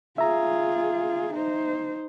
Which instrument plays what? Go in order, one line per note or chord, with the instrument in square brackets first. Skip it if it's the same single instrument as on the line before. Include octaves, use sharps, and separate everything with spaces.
[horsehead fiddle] F4 G#4 [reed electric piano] E5 A#5
[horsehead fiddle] D#4 C5